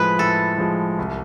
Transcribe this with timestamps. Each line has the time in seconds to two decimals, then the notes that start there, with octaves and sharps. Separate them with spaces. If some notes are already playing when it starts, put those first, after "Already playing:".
Already playing: A2 F3 G#3 B4
0.19 A2 A4
0.58 F3 G#3
0.99 C2